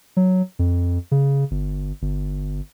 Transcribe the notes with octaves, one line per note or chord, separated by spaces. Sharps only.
F#3
F2
C#3
G1
G1